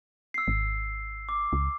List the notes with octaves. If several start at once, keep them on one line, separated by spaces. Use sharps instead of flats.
E6 C7
G#1
D6
C#2